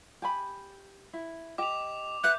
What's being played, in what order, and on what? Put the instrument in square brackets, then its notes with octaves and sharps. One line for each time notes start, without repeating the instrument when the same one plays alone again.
[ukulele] G4 G#5 B5
E4
[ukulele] G4 D#5 [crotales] D6 F7
[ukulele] B4 E5 [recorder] F#6 [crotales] G6